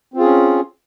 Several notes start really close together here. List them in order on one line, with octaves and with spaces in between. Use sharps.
C4 F4 G#4 C#4